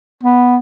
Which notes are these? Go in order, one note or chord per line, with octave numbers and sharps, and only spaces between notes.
B3